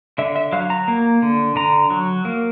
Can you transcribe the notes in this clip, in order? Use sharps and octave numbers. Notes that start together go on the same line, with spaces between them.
D3 E5
E5
F#3 F5
A#5
A#3
D3
D3 A#5
F#3
A#3